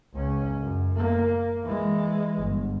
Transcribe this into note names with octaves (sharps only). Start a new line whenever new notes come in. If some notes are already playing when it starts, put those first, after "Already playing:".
C#2 C#4
F#2
A#3
E3 G#3
G1